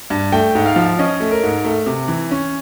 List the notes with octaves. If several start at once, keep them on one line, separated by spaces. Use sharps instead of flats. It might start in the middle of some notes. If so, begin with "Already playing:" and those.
G2
A3 G5
G#2
F5
F3
C#4 D#5
A3
A#4
G#2
A3
C3
E3
C#4